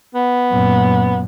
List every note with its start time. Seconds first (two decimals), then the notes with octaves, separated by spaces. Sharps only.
0.15 B3
0.51 F#2 A#2